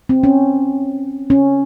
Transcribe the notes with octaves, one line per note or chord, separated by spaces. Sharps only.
C4
C#4
C#4